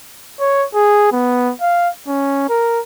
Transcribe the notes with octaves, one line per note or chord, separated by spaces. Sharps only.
C#5
G#4
B3
F5
C#4
A#4